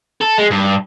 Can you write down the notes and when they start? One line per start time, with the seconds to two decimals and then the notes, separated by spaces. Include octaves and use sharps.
0.21 A4
0.39 G#3
0.51 G2